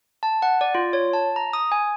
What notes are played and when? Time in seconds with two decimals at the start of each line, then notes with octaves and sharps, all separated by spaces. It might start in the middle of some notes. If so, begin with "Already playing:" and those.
0.23 A5
0.42 F#5
0.61 D5
0.75 F4
0.93 C#5
1.13 A5
1.36 A#5
1.53 D#6
1.72 G#5